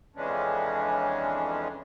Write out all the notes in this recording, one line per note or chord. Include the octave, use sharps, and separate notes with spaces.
F2 C#3 E3 G#3 C#4 D4